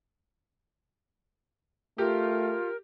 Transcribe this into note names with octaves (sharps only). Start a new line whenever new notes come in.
A3 F4 G4 A#4